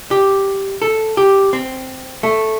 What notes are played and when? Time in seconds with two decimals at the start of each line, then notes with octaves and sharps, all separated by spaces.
0.11 G4
0.82 A4
1.17 G4
1.53 C4
2.23 A3